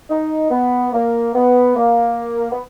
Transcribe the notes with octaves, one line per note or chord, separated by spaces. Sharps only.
D#4
B3
A#3
B3
A#3
B3